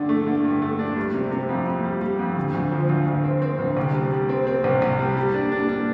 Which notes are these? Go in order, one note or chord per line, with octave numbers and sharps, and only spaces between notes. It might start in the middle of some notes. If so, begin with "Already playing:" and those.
Already playing: G2 D3 D4
A3
D3
G2
A3
D4
G3
C3
C3
F2
F2
G3
G3
F2
D2
D2
F3
D2
D2
C4
C4
D2
C2
G3
G3
C4
C4
C2
C2
G3
G3
D4
D4
D4